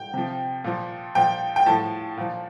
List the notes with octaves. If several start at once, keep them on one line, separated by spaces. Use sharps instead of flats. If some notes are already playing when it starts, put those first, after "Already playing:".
Already playing: G5
C3 F3
A#2 F3
A#2 F3 G5
G5
A2 F3 A5
A#2 F3